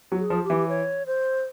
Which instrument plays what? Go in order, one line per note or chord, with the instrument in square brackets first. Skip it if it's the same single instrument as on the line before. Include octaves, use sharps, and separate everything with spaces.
[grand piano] F#3
[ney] G#4
[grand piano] F3
[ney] G4
[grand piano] E3
[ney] C#5
C5